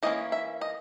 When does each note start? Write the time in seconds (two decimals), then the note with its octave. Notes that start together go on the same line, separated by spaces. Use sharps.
0.03 E3 A#3 C#4 D#5
0.32 E5
0.61 D#5